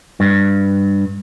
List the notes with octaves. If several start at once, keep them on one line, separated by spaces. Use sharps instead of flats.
G2